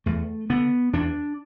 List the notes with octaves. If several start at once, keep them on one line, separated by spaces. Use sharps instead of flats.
E2 A3
D3 B3
E2 D4